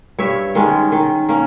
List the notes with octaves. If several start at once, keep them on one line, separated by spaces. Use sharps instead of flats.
G2 C#5 E5
D#3 G#3 C#4
D#3
A#3 C#4